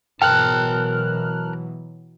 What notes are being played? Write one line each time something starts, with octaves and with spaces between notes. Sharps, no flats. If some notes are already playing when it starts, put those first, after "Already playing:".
B2 E3 F#3 A#4 G5 A5 F6 F#6